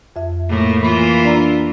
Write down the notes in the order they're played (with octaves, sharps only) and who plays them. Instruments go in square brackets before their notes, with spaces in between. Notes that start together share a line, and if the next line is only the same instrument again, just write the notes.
[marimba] F2 E5
[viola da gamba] A2 A#3
[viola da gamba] E3 A#3 F4 [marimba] B5
[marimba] D4 D5 A#5